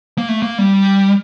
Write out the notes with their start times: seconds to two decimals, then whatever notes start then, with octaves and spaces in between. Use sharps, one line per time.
0.18 A#3
0.29 A3
0.43 A#3
0.58 G3